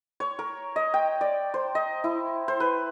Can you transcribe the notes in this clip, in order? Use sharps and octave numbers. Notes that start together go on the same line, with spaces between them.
C#5
A#4
D#5
G5
D5
C5
D#5
E4
C5
B4